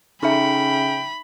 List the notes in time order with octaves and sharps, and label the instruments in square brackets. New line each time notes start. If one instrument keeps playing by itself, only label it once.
[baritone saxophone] C#3 [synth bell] D#4 E5 [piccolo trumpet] G5 [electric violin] B5